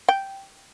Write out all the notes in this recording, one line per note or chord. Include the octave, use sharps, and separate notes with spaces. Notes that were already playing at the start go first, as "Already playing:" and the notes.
G5